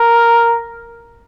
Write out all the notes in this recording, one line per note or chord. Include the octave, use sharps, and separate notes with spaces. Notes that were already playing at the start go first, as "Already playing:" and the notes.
Already playing: A#4